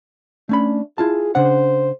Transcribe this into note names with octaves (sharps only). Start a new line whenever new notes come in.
A3 C#4 D4 B5
E4 F4 G#4 A5
C#3 D4 C5 F#5